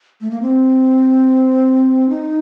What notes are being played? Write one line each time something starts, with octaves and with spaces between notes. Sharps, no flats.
A3
A#3
C4
D#4